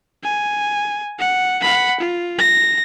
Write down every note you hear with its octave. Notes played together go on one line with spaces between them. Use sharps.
G#5
F#5
F#5 B5
F4
A#6